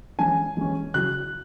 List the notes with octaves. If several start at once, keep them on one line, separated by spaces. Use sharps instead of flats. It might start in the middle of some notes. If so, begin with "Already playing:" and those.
E3 G#3 C#4 G#5
E3 G#3 C#4
C#3 F#3 E4 F#6